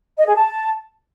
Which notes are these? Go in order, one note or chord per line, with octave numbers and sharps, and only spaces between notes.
D#5
G#4
A5